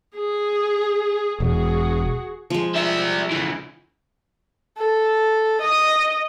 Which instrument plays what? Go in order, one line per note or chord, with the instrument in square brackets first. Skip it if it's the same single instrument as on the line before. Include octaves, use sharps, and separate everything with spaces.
[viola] G#4
[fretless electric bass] E1 [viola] F#4 G#4
[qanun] F3 G#3
[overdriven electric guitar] G3 E5
C#3 E3
[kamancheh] A4
D#5